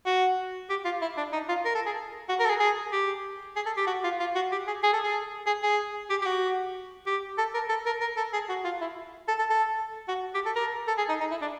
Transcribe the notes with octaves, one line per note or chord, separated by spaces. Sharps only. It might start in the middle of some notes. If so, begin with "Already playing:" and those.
F#4
G4
F4
E4
D4
D#4
F4
A#4
A4
G#4
F#4
A#4
A4
G#4
G#4
G4
G#4
A4
G4
F#4
F4
F4
F#4
G4
G#4
G#4
A4
G#4
G#4
G#4
G4
G4
F#4
G4
A4
A#4
A4
A#4
A#4
A4
G#4
F#4
F4
E4
A4
A4
A4
F#4
G4
A4
A#4
A4
G#4
D#4
D#4
E4
D4